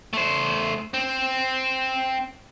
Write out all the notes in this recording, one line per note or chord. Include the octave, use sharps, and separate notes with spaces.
A3 C5
C4